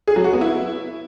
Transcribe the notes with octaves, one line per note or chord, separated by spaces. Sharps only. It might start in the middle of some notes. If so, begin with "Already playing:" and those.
G#4
F#3
F#4
B3
E4